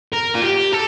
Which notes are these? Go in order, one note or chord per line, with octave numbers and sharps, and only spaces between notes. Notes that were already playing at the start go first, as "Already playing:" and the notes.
A#4
F4
G4
A4